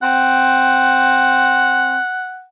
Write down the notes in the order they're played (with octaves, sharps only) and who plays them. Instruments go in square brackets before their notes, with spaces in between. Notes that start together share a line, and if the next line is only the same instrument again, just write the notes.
[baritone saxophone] C4 [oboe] F#5